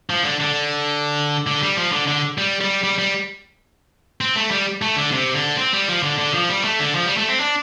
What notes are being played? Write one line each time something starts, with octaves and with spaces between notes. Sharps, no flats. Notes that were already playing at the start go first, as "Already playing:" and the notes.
F3
D3
D3
D3
G3
F3
D3
D3
G3
G3
G3
G3
C4
A3
G3
A3
D3
C3
D3
C4
G3
F3
D3
D3
F3
G3
A3
D3
F3
G3
A3
C4
D4